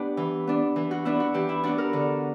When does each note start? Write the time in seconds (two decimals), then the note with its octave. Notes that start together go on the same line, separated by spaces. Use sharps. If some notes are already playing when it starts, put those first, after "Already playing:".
Already playing: B3 D4 G4
0.17 E3
0.47 B3 D4
0.76 E3
0.91 F#4
1.05 B3 D4 E4
1.20 F#4
1.34 E3 G4
1.49 E4
1.63 B3 D4 F#4
1.78 A#4
1.93 D3